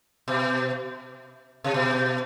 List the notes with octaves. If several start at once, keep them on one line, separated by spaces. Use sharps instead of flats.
B2
C3
B2